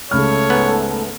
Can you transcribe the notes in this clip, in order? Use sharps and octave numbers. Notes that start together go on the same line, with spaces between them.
C#2 A3 C#5 B5 F6
G#2 B3